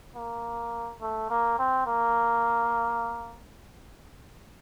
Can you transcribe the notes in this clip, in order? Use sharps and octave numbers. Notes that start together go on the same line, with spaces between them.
A#3
A3
A#3
C4
A#3